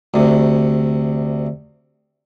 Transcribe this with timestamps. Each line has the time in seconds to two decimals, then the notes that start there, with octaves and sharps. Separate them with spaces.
0.14 D2 C3